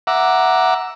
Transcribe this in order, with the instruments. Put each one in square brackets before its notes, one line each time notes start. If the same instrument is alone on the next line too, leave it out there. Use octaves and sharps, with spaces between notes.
[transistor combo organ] E5 F#5 A#5 D6